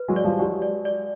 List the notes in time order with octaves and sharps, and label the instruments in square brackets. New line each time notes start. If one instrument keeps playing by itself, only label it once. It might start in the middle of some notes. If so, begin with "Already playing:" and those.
Already playing: [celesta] B4
[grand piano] F#3 G#3
[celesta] D5
[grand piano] F3 G3
[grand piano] F#3 G#3 [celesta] G4
[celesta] D5
D5